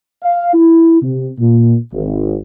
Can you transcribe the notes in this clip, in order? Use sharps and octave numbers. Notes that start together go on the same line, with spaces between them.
F5
E4
C3
A#2
G#1